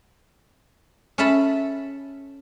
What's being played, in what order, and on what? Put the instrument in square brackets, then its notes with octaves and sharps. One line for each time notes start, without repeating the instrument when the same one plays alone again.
[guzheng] C#4 A4 E5 A5 B5